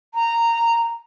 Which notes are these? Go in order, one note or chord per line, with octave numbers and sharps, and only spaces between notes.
A#5